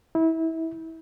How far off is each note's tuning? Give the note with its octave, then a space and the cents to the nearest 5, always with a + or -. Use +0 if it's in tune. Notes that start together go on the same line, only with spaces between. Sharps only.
E4 -25